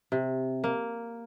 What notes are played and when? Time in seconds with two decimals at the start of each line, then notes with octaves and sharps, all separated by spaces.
0.12 C3
0.64 A#3